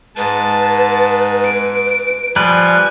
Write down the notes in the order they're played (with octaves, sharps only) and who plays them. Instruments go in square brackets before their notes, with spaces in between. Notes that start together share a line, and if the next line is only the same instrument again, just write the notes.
[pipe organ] G#2 [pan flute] B4 [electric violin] A5
[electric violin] D7
[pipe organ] F3 [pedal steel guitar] G3 B4 [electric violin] G#5